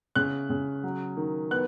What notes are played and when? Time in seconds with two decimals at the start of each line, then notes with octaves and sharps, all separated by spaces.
0.15 C#3 F#6
0.50 C#3
0.83 F#3
1.17 D#3
1.51 B3 F#6